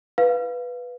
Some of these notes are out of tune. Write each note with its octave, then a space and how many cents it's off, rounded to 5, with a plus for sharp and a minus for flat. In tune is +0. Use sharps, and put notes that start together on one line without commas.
B4 +0 F5 +5